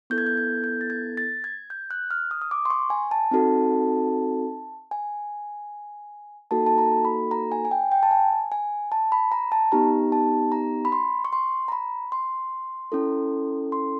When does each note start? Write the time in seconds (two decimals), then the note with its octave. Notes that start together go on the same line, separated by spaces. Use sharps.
0.10 B3 E4 A4 G6
0.18 G#6
0.26 G6
0.37 G#6
0.64 G6
0.81 A6
0.90 G#6
1.17 A6
1.44 G#6
1.70 G6
1.91 F#6
2.11 F6
2.31 D#6
2.41 D#6
2.51 D6
2.65 C6
2.70 C#6
2.90 G#5
3.11 A5
3.31 C4 D#4 F#4 A4
4.91 G#5
6.51 A#3 D#4 F#4 A4 A5
6.66 A5
6.78 A#5
7.05 B5
7.31 A#5
7.52 G#5
7.65 G#5
7.71 G5
7.92 G5
8.03 A5
8.11 G#5
8.52 G#5
8.92 A5
9.12 B5
9.32 A#5
9.52 A5
9.72 B3 D#4 G4 A#5
10.12 A5
10.52 A#5
10.85 B5
10.92 C6
11.25 C#6
11.33 C6
11.68 A#5
11.72 B5
12.12 C6
12.92 C#4 E4 A4
13.72 C6